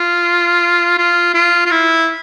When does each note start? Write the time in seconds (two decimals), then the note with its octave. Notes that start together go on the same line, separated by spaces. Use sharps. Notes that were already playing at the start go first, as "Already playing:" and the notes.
Already playing: F4
0.98 F4
1.34 F4
1.66 F4
1.71 E4